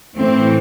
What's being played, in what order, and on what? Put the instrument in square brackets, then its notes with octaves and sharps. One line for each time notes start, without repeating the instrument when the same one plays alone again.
[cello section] A2 E3 C4